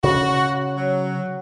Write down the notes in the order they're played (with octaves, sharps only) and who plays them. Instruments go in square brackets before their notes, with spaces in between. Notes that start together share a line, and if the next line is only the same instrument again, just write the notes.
[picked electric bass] C#3 [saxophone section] F#4
[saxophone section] F#3